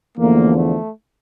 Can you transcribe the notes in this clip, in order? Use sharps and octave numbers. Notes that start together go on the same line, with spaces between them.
E2 D3 F3 A3 A#3
A3